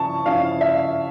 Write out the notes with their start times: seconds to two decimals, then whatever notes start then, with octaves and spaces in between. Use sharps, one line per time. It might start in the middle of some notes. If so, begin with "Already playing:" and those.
Already playing: C#3 F3 C#4 E4 A5 C#6
0.26 C#3 F3 C#4 E4 F5
0.61 E5